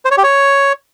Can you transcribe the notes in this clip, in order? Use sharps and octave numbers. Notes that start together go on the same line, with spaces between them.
C5
C#5
G4
C#5